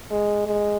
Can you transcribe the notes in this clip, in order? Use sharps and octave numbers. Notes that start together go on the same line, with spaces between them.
G#3
G#3